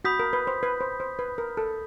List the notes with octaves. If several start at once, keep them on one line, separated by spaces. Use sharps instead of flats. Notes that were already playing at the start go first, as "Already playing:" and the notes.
F#4 B5 D#6 G6 B6
A#4
B4
C5
B4
C5
C5
B4
A#4
A4